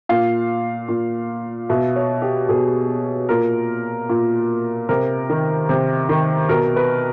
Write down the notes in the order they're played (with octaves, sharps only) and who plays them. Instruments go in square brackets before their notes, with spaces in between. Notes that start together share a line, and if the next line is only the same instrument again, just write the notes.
[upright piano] A#2 F5
A#2
B2 E5
C#5
G4
B2 G#4
A#2 A#4
A#2
C3 A#4
D#3
C3
D#3
B2 A#4
B4